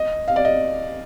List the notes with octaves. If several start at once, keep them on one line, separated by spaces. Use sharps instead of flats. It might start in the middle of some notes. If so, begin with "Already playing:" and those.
Already playing: D#5
F5
D5
D#5